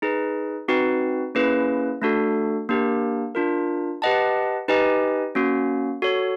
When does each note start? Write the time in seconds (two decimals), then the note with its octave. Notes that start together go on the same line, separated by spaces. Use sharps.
0.02 D#4 G#4 B4
0.68 C4 D#4 F#4 B4
1.35 A#3 C#4 E4 G#4 B4
2.02 A3 D4 F#4 A4
2.69 A#3 D4 G4 A#4
3.35 D4 F4 A#4
4.02 G4 B4 D#5 F#5 A5
4.68 D#4 G4 B4 D#5 G#5
5.35 A#3 C#4 F#4
6.02 F#4 A4 C#5